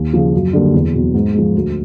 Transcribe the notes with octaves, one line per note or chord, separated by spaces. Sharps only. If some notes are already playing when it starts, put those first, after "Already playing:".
Already playing: D#2
C#3 F3
F#2
D3 G3 A#3
E2
B2 F#3
G#2
F3 G#3
D2